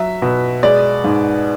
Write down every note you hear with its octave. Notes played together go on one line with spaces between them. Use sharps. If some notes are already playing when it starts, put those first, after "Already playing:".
Already playing: F#3 E5
B2
G#3 D5
G#2